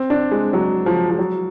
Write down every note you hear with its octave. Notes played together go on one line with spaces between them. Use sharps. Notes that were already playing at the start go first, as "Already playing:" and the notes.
Already playing: C4
D4
G#3
F#3
F3
F3
F#3